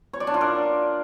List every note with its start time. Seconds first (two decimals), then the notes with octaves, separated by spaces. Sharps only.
0.13 C#5
0.20 D5
0.27 D4
0.34 F4
0.41 A#4